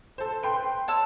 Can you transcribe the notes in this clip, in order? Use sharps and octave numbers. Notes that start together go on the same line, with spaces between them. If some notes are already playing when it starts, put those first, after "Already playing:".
A4 C5
B4 G5 C6
C#5 A5 E6